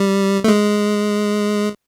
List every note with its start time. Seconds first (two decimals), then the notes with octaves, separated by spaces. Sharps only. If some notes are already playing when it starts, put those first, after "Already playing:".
Already playing: G3
0.44 A3
0.48 G#3